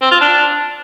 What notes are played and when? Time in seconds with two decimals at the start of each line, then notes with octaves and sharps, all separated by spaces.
0.01 C4
0.11 F4
0.21 D4